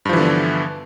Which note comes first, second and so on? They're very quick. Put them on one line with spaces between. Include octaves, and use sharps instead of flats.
G2 F3 E3 D3 B3